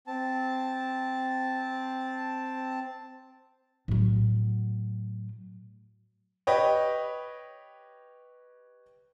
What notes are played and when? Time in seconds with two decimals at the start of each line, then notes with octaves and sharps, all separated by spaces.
0.07 C4 A5
3.88 A2 F#3
6.47 G4 B4 C#5 D#5 G5